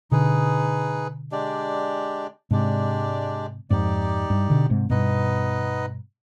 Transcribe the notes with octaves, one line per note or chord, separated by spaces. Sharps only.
B2 D3 D#4 G#4 B4
G#3 D4 G4 D5
G#2 C3 G#3 D4 G4 D5
F2 G#2 D#4 G4 D5
G2
B2 D3
G#2 C3
G2 B2 B3 D#4 B4 D#5